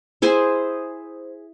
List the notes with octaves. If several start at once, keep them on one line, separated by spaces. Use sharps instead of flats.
E4 G#4 C5 G#5